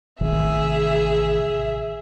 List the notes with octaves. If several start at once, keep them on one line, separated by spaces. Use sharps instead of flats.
A1 C3 D#3 G#4 E5